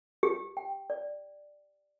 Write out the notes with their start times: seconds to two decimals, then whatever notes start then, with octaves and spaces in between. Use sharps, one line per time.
0.23 G4
0.57 G5
0.90 D5